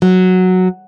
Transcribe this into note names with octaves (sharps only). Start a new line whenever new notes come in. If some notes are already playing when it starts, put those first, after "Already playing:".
F#3